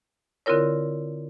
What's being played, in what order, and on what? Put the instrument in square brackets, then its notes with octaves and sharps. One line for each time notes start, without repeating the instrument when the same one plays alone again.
[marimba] D3 C4 E4 F4 A#4 C#5